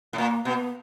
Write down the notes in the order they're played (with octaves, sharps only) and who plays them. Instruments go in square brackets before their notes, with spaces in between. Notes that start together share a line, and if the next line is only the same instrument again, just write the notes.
[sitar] A2
[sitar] A#2 [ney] A#3
[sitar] B2 [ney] B3